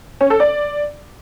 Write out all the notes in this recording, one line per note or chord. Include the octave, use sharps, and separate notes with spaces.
C#4
A4
D5